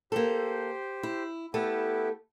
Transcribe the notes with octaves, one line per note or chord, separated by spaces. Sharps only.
A#3 G4 A4 C5
E4
A3 B3 E4 G4 A4